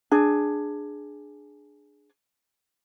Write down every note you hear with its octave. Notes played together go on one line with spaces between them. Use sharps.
D4 G#4